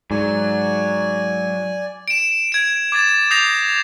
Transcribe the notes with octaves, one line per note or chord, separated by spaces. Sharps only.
G#2 F#3 D5 G#5
D7 E7
G#6 D7
D6 G#6 A6 E7
D#6 G6 A#6 C7 F7